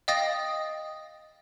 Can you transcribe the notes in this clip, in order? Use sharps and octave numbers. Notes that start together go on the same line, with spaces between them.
D#5 F5 G5 D#6 A6 A#6